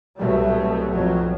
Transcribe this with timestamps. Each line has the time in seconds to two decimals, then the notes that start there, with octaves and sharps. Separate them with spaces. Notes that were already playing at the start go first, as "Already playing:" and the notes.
0.17 C2 B2 F#3 G3 A3
0.89 B1 F2 F#3